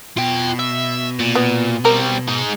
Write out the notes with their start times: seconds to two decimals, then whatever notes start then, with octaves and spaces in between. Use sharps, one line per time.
0.17 B2 F4 G5
0.59 E5
1.19 A#2
1.35 B3
1.85 G3 C4 A#4
2.28 G#3 D#4